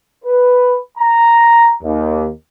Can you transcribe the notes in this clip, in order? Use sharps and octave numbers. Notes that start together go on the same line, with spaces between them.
B4
A#5
D#2